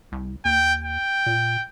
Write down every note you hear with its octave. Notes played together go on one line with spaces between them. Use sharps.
C2
D#2 G5
G5
A#2